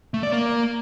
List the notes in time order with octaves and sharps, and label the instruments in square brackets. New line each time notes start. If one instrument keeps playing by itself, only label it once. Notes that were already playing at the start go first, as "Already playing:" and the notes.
[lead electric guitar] A3
D5
A#3